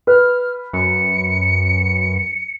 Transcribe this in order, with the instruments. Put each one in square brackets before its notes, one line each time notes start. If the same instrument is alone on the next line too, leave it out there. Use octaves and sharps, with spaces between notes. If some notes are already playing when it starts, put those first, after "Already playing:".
[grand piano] B4 [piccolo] F6
[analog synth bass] F#2 [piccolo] C#7